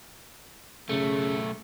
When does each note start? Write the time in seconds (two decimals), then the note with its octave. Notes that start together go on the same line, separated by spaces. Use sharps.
0.89 B1 C#3 A3